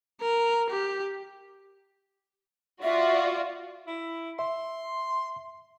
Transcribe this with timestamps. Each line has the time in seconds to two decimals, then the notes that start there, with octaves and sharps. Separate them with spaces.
0.21 A#4
0.70 G4
2.83 F4 F#4 D5 E5
3.87 E4
4.39 E5 C6